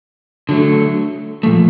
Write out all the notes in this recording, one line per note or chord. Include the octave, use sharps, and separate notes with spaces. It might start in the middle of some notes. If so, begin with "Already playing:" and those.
D3 F#3 A3
A#2 F3 A3